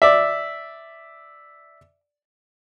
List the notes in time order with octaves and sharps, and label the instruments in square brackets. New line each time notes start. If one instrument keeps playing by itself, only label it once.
[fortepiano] D5 E5